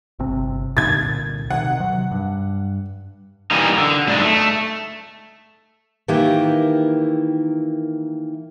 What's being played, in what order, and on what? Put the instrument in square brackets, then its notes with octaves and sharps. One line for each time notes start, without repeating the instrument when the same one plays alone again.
[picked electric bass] G1 C3 C4
[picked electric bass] C2 A#2 D3 [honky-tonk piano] G#6 A6
[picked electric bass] C3 D#3 [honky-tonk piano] F#5
[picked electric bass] C3 F#3
G2
[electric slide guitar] E3 G3 A#3 D#4
D3
G2 A3 D#4 G#4 D5 D#5
A3
[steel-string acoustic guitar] D#3 E3 A#3 E4 G4